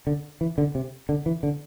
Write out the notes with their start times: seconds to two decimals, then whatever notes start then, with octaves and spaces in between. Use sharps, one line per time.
0.07 D3
0.41 E3
0.58 D3
0.75 C3
1.09 D3
1.26 E3
1.43 D3